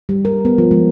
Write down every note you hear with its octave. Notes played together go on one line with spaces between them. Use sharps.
G3
A#4
B3
F3
G#3